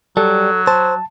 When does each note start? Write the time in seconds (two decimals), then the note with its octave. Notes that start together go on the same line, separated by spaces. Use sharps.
0.17 F#3 G3 A4
0.67 C5 A5